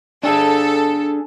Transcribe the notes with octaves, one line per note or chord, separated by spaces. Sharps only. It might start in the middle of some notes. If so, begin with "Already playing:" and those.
D4 G#4 A4